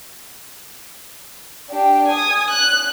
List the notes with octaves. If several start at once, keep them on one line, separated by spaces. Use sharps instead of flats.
D4 G4
G#5 D#6
F#6